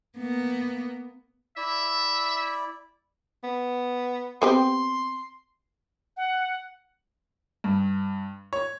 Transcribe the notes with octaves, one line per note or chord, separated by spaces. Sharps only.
A#3 B3
E4 D5 E5
B3
B3 C4 G4 C6
F#5
G2
C#5